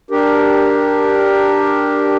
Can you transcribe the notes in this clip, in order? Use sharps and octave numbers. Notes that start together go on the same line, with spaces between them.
D4 G4 A#4